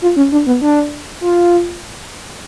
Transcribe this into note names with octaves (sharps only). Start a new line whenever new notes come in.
F4
C#4
D4
B3
D4
F4